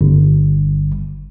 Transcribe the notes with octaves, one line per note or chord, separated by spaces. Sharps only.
G1